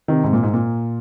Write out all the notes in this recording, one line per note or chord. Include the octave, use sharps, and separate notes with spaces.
C3 D#3
G#2 C3
A#2
G#2
A#2